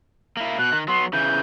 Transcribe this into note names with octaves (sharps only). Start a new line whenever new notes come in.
A#3 E4
B2 F#6
D#3
F#3 B3 C6
C#3 E3 G6